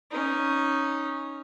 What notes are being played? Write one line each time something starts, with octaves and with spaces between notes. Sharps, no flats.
C#4 D#4